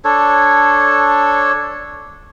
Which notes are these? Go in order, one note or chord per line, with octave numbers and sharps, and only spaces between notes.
D4 A4 C#5